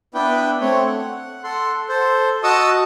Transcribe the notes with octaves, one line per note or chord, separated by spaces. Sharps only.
B3 D4 E4 B4 G5
A3 C4 C#5
F#5
A4 F#5 C6
A4 C5
F#4 D#5 A5 C#6 D#6 E6